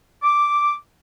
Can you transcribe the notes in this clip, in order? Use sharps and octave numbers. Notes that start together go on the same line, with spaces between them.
D6